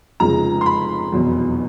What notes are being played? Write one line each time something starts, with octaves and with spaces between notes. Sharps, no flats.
F1 F2 C#3 F3 G#3 A#5
C6
B5
F1 E2 B2 F#3